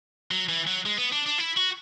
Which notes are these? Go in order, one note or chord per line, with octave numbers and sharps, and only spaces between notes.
F#3
E3
F#3
G#3
B3
D4
D4
E4
F#4